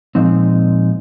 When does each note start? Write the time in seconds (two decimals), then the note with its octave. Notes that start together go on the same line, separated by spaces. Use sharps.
0.15 A#2 F3 G#3 C4 D#4